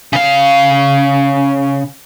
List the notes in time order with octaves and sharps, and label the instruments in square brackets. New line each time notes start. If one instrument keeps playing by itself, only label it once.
[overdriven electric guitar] C#3 F5